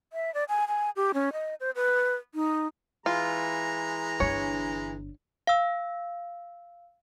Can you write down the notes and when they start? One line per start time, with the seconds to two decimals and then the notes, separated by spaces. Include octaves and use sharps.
0.13 E5
0.34 D5
0.49 G#5
0.68 G#5
0.96 G4
1.14 C#4
1.33 D#5
1.60 C5
1.76 B4
2.35 D#4
3.06 E3 G#3 F4 A#5
4.20 G1 D3 C#5
5.47 F5 E6